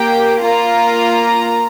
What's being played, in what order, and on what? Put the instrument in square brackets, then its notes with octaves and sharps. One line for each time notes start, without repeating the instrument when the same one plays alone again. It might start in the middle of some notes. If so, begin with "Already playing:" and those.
Already playing: [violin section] A#3 G4 G5
A#3 F4 A#5